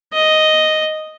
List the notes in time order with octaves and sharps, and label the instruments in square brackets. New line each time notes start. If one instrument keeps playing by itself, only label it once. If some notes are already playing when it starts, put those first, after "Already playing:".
[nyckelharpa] D#5